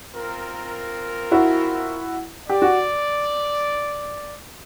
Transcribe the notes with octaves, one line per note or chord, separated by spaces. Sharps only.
C4 F4 A#4
E4 F#4
G4 D5
F#4